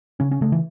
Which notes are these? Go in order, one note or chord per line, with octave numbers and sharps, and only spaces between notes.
C#3 C#4
C#4
C#3 A3
E3